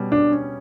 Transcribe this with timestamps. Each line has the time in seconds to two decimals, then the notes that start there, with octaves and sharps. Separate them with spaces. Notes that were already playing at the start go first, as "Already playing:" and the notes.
Already playing: B2 G3 C#4
0.12 G3 D4
0.32 C#4